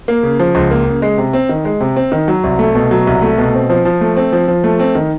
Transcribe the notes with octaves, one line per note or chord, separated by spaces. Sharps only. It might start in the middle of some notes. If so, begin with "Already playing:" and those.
A#3
C#3
F3
C#2
A#3
C#3
G#3
C3
C4
D#3
G#3
C3
C4
D#3
F#3
C2
A3
B2
F#3
C2
A3
B2
C4
F3
F3
A3
C4
F3
F3
A3
C4
D#3